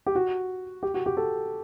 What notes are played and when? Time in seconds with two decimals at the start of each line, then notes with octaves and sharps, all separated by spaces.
0.06 G4
0.15 F#4
0.83 G4
0.94 F#4
1.06 G4
1.17 A4